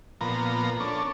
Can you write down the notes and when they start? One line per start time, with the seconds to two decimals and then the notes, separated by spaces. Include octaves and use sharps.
0.21 A#2 F3 B3 A#5
0.80 C#4 D4 A4